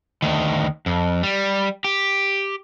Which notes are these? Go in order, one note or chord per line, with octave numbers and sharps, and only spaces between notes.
D2 D#3
F2
G3
G4